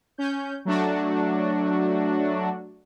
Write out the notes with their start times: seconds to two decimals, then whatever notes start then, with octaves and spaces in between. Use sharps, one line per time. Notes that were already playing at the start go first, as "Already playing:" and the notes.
0.18 C#4 G6
0.65 F#3 A3 D4 F#4